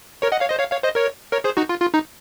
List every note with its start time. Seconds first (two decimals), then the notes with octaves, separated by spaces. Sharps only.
0.22 A#4 C#5
0.32 D#5 F#5
0.40 C#5 F5
0.50 C5 D#5
0.59 C#5 F5
0.71 C#5 F5
0.83 C5 D#5
0.95 A#4 C#5
1.32 A#4 C#5
1.44 G#4 C5
1.57 D#4 F#4
1.69 F4
1.81 F4
1.94 D#4